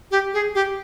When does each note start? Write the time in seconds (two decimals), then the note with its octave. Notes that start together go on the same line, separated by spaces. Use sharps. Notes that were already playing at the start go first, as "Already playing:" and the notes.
0.11 G4
0.34 G#4
0.55 G4